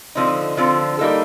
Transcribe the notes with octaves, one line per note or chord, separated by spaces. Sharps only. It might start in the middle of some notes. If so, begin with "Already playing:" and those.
D3 F3 C4 D#4
D3 F3 C4 F4 A4
G3 A#3 D#4 A4